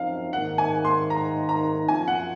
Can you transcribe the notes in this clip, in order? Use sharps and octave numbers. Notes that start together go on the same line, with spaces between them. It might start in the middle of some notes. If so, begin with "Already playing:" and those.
Already playing: F#2 F3 C4 D#4 F5
G#2 D#3 A#3 D#4 F#5
G#5
C6
A#5
A#5
F#2 F3 C4 F4 G#5
F#5